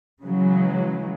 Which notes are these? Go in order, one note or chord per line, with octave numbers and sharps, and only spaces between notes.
C#3 E3 F#3 G#3